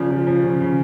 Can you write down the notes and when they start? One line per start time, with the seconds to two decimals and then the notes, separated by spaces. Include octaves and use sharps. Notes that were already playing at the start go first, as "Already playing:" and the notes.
Already playing: C#3 F3 D5
0.10 F3
0.27 F3
0.44 C#3
0.61 C#3